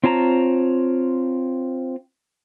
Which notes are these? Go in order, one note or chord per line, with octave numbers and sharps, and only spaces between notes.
C4 F4 C#5 A5 A#5